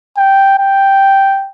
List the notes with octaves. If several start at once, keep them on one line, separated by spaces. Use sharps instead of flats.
G5
G5